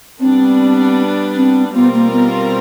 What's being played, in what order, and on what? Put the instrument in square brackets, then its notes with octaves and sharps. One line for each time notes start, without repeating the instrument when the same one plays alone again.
[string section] G3 B3 D4 [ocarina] C4
[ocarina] C4
[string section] B2 G3 C4 F4 A#4 [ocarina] B3
[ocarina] A#3
B3